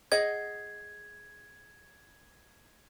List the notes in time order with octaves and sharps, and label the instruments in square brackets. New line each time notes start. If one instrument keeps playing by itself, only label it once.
[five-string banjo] G#4 D#5 F#5 [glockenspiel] G#6